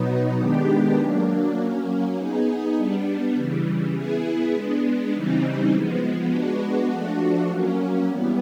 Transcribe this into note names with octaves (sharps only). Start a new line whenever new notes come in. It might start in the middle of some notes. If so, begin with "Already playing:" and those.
Already playing: B2 F#3 B3 D#4
D#3 G#3 B3 D4 G4
F#3 A#3 D4
F#3 A#3 C#4
B3 D#4 G#4
G3 B3 D4
C#3 E3 G3
B3 E4 G#4
G#3 B3 D4
C#3 E3 G3 C4 D#4
F3 G#3 B3
G#3 B3 D4 F#4
F3 A3 D4 F#4
F#3 A#3 C#4
E3 G3 B3